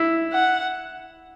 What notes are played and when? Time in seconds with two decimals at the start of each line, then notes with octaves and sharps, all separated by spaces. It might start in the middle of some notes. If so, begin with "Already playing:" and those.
Already playing: E4
0.33 F#5